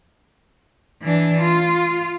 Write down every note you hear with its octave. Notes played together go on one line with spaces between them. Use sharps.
E3 D4
F4